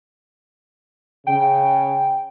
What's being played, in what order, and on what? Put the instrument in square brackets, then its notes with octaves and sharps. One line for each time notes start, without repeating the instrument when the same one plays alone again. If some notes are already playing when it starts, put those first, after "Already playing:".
[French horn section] C#3 [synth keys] G5